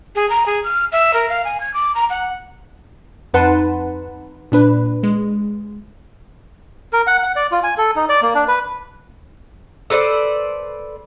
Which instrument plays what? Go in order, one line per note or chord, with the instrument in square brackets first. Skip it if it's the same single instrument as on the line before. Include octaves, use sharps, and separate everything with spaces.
[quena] G#4
A#5
G#4
F6
E5
A#4
F5
G#5
G#6
D6
A#5
F#5
[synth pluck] F2 D#4 B4 F#5 A5 C6
A#2 D4 B4
G#3
[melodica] A#4
F#5
F#5
D5
F4
G#5
A4
D#4
D5
A#3
D4
B4
[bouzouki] A4 B4 C5 D5